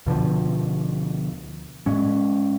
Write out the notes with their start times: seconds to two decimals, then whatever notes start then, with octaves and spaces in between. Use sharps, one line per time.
0.06 D2 B2 D3 F3
1.86 A2 G#3 C#4